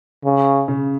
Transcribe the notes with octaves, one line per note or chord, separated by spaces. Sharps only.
C#3
C#3